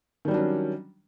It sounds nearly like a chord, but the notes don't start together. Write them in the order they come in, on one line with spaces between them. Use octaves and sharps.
D#3 G3 F#3 D4 C#4